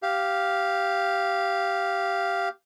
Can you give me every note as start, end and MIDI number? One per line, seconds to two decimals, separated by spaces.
0.03 2.49 67
0.03 2.49 77